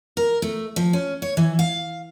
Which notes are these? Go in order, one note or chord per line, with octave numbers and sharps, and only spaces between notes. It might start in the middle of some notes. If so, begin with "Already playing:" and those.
A#4
A3
F3
C#4
C#5
E3
F5